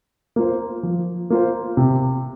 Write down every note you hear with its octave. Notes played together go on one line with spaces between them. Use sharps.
A#3 F4 C5
F3
A#3 F4 C5
C3